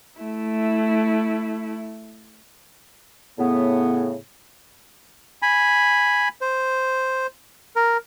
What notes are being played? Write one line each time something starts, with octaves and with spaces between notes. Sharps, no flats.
A3 E4
A2 C#3 B3
G#5 B5
C5
A#4